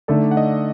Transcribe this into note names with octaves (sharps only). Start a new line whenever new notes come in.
D3 A3 D#4 A4 D5
F#5
D#5